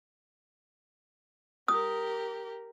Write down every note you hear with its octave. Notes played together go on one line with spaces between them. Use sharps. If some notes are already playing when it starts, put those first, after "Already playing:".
G4 A#4 D#6